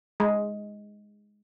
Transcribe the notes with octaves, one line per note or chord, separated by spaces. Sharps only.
G#3